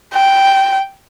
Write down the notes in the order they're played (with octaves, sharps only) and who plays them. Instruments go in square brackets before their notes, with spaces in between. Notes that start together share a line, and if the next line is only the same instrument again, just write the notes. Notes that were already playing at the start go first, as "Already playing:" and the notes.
[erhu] G5